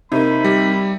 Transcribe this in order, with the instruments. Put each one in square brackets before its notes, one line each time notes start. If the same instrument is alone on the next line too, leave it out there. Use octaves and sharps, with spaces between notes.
[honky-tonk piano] C3 A#3 [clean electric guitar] D#4 [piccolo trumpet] B5
[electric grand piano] G3